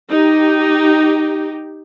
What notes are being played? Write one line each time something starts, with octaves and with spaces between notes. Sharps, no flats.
D#4 G4